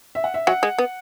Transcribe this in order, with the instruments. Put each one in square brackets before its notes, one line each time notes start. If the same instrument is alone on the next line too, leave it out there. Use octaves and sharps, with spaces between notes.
[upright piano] E5
F#5
E5
[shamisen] F#3 [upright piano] F#5
[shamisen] G#3
B3